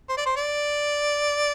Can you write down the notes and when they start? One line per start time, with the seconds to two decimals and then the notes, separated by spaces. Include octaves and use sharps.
0.09 C5
0.17 D5
0.26 C5
0.36 D5